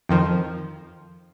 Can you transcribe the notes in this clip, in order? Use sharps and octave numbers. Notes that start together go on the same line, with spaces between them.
F2 D#3 F3